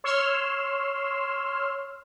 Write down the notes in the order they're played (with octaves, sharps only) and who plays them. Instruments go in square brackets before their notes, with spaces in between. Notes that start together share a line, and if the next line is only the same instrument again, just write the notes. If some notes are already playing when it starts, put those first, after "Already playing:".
[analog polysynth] C#5 C6 E6 F6